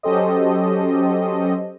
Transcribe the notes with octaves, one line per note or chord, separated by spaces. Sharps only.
F#3 C#4 G4 A4 C5 D#5